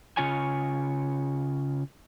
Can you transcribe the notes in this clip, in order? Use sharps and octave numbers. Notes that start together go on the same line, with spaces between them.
C#3 C#4 F4 C#5 G#5